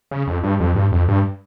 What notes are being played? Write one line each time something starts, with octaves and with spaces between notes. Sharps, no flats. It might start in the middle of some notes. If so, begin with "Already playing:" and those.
C#3
F2
G2
F2
G2
F2
G2